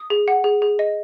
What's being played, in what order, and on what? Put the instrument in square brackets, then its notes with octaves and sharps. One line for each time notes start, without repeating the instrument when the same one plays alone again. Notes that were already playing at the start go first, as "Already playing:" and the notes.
Already playing: [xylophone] D#6
G#4
F#5
G#4
G#4
D#5